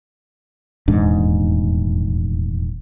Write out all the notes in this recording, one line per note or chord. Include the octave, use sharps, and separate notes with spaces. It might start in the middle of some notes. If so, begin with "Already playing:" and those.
D#1 E2 G#2 D4